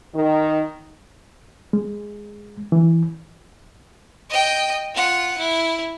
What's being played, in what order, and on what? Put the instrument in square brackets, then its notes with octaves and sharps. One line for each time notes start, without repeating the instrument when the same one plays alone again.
[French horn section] D#3
[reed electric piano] G#3
E3
[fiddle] D#5 G5
F4 F#5
E4